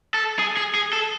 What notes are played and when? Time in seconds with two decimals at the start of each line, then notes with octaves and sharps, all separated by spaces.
0.14 A4
0.39 G#4
0.57 G#4
0.75 G#4
0.93 A4